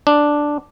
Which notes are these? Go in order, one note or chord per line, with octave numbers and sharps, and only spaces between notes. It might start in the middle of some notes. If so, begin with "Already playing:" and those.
D4